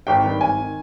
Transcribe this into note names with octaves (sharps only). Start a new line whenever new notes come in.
G#1 G5
G2 D#3
G#1 G#5
D#3